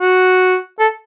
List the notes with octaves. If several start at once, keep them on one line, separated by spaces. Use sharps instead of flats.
F#4
A4